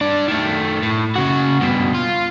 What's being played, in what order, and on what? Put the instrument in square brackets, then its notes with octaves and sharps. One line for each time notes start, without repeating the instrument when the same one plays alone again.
[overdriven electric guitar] G3 D4
D#3 A3
A2
C#3 F#4
G2 B2
F4